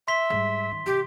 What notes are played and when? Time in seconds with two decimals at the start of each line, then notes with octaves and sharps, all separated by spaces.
0.08 E5 C6 B6 G7
0.30 G#2 G3
0.71 D#3
0.86 C3 E3 G4